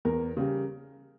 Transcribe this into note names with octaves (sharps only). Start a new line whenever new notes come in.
E2 A#4
C#3 G3